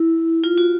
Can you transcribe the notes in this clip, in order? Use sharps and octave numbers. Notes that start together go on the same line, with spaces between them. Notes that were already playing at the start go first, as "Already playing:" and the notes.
Already playing: E4
F4
F#4